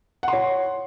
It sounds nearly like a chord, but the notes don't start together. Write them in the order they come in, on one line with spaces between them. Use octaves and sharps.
F#5 C6 C#5